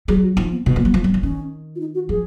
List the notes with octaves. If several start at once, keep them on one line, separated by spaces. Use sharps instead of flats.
F#3 G#4
F#4
F3 D#4
B3
B2 B3
F3 A#3
F#3
F3 B3
F#3
F3
D#3 C#4
F4
D#4
F#4
F3 G#4